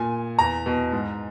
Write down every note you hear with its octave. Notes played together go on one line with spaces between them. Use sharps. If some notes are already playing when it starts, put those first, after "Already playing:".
Already playing: A#2 G#5
E2 A#5
B2
G#2